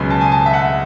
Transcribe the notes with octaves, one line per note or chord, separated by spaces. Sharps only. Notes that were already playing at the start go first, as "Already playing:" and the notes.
Already playing: C#2 B2 F#3 C#4 B5
A5
G#5
A5
E5
F#5